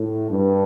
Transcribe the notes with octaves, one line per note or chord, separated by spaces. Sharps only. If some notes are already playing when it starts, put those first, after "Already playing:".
Already playing: A2
G2